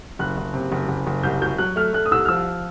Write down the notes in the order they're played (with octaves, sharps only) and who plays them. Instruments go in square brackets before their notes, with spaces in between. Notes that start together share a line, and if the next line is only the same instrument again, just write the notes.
[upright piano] F#1 F#6
F#1
C3
F#1
F#1
F#1
C2 G6
F#3 G6
F#3 F#6
A3 F6
A3 F#6
D#6
C2 E6
F6
F3 E6